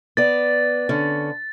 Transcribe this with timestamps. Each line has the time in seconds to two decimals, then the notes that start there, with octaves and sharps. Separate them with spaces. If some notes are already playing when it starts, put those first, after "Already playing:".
0.17 B3 D5 A6
0.89 D3 C#4